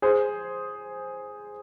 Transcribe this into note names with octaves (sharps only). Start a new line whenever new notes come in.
G#4 C5